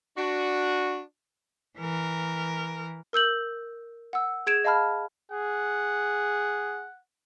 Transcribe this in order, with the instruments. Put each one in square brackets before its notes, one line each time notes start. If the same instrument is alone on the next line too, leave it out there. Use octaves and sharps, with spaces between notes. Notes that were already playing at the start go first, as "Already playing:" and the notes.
[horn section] D4 F#4
[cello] E3 A#4
[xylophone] A#4 E6 G6 F#7
F#5 E6
G#4 G#6 D7 E7
D#5 F5 A5 B5 F6
[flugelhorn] G#4 [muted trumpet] F#5